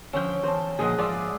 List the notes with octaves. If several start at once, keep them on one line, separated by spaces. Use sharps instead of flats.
D3 F3 C#4 G5
E2 C5 A5
A#2 D3 F3 G#4 D#5 F#5
G#2 F3 F4 D5 E5